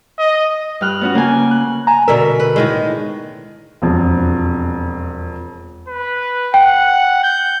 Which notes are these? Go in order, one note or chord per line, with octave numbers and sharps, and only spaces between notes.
D#5
G2 G5 F6 F#6
B3 C#4 F#4
C#3 A#3 G5 G#5
F#6
G#5 A#5
B2 D3 A#4 E5
B4
A2 D#3 G#3
E1 F2
B4
F#5 G5
G6